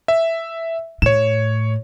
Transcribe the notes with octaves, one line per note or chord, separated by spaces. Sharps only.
E5
A2 C#5 E7